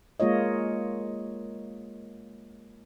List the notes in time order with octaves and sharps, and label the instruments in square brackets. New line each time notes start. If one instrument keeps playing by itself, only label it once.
[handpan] G#3 A#3 F4 C#5 D#5